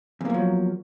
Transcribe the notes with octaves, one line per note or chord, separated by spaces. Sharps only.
E2 F3 F#3 A#3